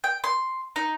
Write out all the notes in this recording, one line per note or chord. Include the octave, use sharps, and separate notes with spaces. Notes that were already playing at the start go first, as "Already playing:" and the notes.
G5
C6
D#4